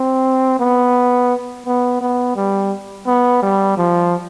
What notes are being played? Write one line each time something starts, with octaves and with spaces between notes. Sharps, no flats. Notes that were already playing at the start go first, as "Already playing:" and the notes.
Already playing: C4
B3
B3
B3
G3
B3
G3
F3